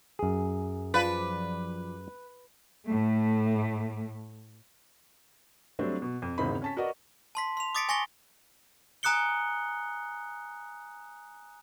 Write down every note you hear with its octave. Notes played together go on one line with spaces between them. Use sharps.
F#2 G#4
F3 B4 D5
A2 A3
F#3 G3 A3 C4 D4
B2
F2
G#1 E2 C#3 C4 D#4 B5
C#4 A5 B6
F#4 A#4 B4 D5 D#5 F#5
A5 C6 B6
C6 F7
D6 D#6 A6 B6 C#7 D7
G#5 C#6 A#6 C#7 G7
G#5 A#5 D#6 F#6 C#7 G7